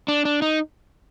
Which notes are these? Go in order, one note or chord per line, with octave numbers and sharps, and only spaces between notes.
D4
D4
D#4